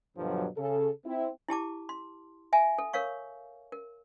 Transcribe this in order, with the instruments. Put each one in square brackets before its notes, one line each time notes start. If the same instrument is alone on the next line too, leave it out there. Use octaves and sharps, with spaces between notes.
[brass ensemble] G2 B2 D3 F3 F#3
C#3 A4
C4 E4
[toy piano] E4 G4 A5 D6
C6
E5 G#5
A4
A#4 C#5 F5 C#6
A#4